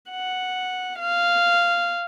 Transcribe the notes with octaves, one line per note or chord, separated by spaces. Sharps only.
F#5
F5